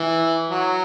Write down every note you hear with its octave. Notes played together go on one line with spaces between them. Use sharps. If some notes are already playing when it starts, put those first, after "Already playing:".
Already playing: E3
F#3